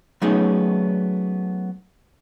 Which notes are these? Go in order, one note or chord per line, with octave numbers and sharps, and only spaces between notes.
F#3 A3 B3 C#4 D#4 G#4